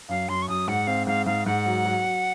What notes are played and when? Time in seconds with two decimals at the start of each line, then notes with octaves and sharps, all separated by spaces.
0.09 F#2 F5
0.28 F#2 C6
0.42 C#6
0.48 F#2 D#6
0.68 G#2 F#5
0.87 C4 F5
1.07 G#2 F5
1.26 G#2 F5
1.46 G#2 F#5
1.66 F#3
1.85 F#3
2.04 F#3